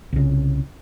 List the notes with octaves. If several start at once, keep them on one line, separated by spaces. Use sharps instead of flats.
C2 C#3